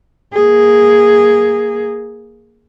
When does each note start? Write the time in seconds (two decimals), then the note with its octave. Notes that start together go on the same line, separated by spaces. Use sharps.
0.34 A#3 G#4